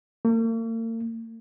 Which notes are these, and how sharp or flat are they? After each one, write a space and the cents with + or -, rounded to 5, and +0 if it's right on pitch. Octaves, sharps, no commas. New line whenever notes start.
A#3 -45